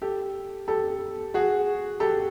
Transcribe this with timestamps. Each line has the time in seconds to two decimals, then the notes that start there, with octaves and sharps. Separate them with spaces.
0.02 G4 A4
0.68 G4 A4
1.34 F#4 G#4
2.00 G4 A4